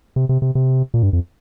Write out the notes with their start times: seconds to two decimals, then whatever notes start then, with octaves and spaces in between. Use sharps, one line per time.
0.16 C3
0.29 C3
0.42 C3
0.55 C3
0.94 A#2
1.03 G2
1.13 F2